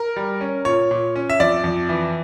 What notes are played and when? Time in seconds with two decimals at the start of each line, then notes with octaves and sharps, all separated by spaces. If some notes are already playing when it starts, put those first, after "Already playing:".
Already playing: A#4
0.16 G3
0.41 C#4
0.65 A#2 C#5
0.91 A#2
1.16 C#4
1.30 E5
1.40 F2 D5
1.64 F2
1.89 E3